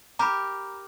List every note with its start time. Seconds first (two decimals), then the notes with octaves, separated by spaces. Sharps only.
0.19 G4 A#4 A#5 B5